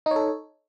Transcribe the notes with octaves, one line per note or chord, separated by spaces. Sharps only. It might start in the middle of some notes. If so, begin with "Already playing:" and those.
D#4 A4 C#5